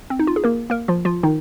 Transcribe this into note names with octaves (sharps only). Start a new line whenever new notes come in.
C4
D#4
F4
G#4
A#3 A#4
A#3 A#4
F3 F4
F3 F4
D#3 D#4